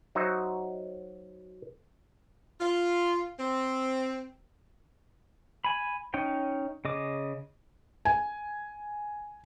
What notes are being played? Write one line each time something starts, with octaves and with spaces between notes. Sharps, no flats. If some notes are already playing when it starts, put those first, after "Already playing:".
F#3 D#4 F#4 C5 D#5 E5
F4
C4
G#5 B5
C#4 D#4 G5
C#3 D#5 D6
G#5